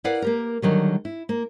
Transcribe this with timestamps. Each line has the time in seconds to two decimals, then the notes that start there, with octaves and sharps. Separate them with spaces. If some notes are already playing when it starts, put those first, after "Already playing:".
0.04 E4 A#4 B4 D5 F5 F#5
0.22 A#3 G4 A#4
0.62 D3 D#3 F#3 G3
1.05 E4
1.29 A#3